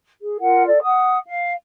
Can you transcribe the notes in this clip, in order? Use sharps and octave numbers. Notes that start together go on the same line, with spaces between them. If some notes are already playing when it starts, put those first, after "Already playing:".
G#4
F4 A#4 F#5
A4 D5
F#5 D#6
F5